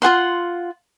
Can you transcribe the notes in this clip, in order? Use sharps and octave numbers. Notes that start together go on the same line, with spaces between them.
F4 G#4 F#5 C6